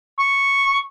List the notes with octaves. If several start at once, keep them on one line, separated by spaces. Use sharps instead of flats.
C#6